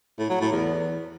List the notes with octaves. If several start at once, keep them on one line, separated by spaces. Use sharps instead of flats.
A2
F#3
A2
E2